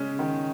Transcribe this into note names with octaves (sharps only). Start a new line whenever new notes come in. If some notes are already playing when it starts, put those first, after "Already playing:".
Already playing: C#3 G#3 C#4
D#3